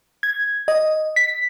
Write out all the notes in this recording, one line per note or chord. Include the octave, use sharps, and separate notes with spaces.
G#6
D#5
B6